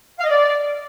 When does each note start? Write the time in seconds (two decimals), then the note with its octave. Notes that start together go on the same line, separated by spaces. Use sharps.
0.19 F5
0.24 D#5
0.29 D5